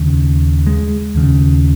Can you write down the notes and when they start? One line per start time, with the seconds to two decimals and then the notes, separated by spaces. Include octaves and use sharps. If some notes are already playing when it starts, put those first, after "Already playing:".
Already playing: D#2 C#3
0.67 G#3
1.15 D#2 C#3